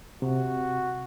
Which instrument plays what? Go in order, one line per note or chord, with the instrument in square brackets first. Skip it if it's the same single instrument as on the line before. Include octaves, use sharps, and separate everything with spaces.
[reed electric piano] C3 [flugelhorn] F#4